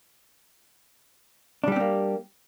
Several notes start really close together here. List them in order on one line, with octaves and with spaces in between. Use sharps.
D4 G3 G4 C4 A#3